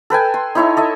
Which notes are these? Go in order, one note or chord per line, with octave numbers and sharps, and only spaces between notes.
A4 B4 G5 G#5
C6
D#4 E4 C#5 E5
A4 D#5 E5